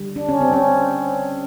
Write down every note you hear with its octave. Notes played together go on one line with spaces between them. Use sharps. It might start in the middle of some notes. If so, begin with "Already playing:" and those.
Already playing: D3 G3
D4
C#4
C4
C#4